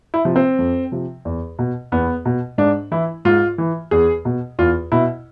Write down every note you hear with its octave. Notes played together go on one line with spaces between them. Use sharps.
E4
C3 F3
C4
F2
C3 F3
E2
B2
E2 B3
B2
G#2 D4
E3 E4
G#2 F4
E3
E2 G#4
B2
E2 F4
B2 E4